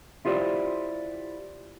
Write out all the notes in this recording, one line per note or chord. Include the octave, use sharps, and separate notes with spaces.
E4 F4 G4 C5 D5